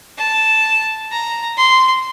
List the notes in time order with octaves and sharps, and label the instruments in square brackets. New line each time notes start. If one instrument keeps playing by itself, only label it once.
[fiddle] A5
A#5
C6